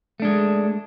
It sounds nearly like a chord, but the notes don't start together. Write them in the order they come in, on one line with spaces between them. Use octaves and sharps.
A3 D4 G#3